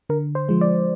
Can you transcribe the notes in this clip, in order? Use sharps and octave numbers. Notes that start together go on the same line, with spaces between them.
D3 A#4
C5
F3 G#3
D5